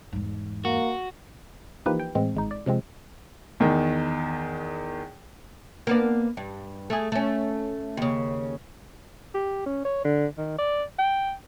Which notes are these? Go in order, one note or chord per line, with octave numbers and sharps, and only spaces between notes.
E2 G#2
A#3 F#4
E3 F3 A#3 D#4 G4 B4
G5
A2 E3 G#3 C4
G#1 G#3 D#4
D5
C3 F3 G#3 C4
E2 D#3
A#3 B3 D4
G2
A3 G#4
A3 C#4
D#2 C#3
G4
C#4
C#5
D3
D#3
D5
G5